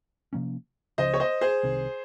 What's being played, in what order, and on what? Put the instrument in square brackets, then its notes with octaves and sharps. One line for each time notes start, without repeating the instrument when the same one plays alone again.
[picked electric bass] C3 F3 A#3 C#4
[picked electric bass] C#2 C#3 F3 [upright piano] C5 D#5
[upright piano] C#5
C5 D#5
G#4 C5
[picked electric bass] C2 C3 D#3